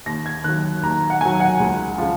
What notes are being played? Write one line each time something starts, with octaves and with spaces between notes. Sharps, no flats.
D#2 A#6
G#6
D#3 F#3 F#6
D#2 A#5
F#5
D#3 F#3 G#5
F#5
C#2
C#3 F3